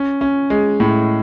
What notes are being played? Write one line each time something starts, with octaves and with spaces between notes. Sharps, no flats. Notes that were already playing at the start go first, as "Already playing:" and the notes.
Already playing: C#4
C#4
G#3
A2